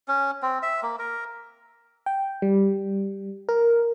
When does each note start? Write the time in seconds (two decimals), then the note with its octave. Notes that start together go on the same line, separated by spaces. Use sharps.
0.08 C#4
0.42 C4
0.63 E5
0.83 A#3
0.99 A#4
2.06 G5
2.42 G3
3.49 A#4